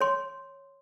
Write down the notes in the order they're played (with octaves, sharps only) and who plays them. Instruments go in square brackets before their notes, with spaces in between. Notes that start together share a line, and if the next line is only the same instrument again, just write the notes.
[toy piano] C#5 C6